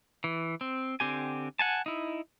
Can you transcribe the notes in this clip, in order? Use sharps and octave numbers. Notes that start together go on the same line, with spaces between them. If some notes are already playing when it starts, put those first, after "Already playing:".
E3
C4
D3 C4 G4 G#5
F#5 G#5 A5
D#4 E4